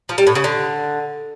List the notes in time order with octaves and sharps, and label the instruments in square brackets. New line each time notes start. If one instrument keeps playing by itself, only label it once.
[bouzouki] F3
G3
A2
C#3
D3